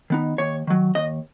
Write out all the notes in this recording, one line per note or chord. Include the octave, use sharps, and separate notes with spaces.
D#3 B3 D#4
D#2 C#5
D#3 F#3
D#2 D#5